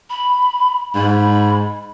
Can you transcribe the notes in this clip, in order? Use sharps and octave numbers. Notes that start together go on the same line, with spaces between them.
B5
G#2 B5